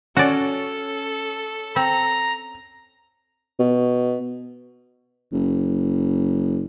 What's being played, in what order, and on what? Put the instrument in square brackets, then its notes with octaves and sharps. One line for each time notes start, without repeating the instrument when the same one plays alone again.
[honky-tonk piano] C#4 [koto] F#4 D5 [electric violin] A4
[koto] C4 [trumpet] A#5
[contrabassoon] B2
F#1